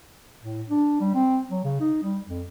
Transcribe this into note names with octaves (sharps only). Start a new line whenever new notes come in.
A2
D4
G3
C4
F#3
C#3
D#4
G3
F2